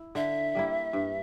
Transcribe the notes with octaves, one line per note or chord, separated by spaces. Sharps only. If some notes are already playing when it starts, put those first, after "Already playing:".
Already playing: E4
D3 E5
G3 A#3 E4
G2